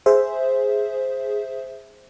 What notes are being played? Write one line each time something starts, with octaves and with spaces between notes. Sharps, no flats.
G#4 C5 E5